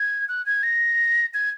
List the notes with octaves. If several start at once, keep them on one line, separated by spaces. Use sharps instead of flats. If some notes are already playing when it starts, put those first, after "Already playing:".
Already playing: G#6
F#6
G#6
A#6
G#6